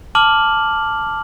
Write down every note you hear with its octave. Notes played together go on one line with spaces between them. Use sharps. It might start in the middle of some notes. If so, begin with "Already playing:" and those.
A5 D6 F6 F#7